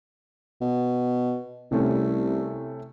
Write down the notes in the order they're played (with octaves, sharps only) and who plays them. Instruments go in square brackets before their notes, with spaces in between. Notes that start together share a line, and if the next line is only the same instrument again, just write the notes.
[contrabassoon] B2
[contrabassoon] C2 [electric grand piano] C3 A3 C#4